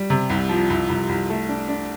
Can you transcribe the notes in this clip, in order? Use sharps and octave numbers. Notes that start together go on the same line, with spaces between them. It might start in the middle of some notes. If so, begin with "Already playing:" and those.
Already playing: G3
C3
C2
F3
C2
C2
C2
A3
D4
D4